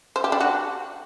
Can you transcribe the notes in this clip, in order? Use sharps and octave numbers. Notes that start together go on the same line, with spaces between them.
C5
G4
D4
F#4